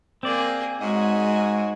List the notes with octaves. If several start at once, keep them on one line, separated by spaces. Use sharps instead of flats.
A#3 C4 G#4 D5
G#2 G#3 F#4 C#5 D#5 G#5